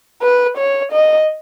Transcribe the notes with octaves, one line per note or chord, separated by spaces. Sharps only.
B4
C#5
D#5